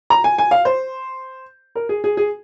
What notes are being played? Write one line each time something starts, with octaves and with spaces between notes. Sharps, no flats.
A#5
G#5
G#5
F5
C5
A#4
G#4
G#4
G#4